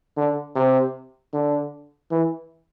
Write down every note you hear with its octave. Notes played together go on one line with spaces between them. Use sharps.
D3
C3
D3
E3